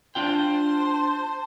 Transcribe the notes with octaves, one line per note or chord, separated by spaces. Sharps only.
D4 F4 C5 G5 A5 C6